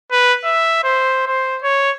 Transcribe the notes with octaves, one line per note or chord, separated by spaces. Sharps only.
B4
E5
C5
C5
C#5